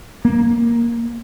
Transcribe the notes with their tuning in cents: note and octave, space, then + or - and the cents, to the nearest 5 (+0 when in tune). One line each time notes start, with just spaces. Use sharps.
A#3 +5